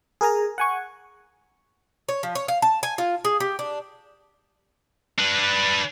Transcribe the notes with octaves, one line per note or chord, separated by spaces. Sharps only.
G#4 A#4 G#5 A#5
F#5 G#5 C#6
C#5
F3
C#5
F5
A5
G#5
F4
G#4
G4
D4
D4 B4